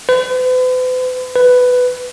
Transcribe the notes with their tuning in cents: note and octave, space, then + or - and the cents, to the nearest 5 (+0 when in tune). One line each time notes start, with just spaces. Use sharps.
B4 +45
B4 +10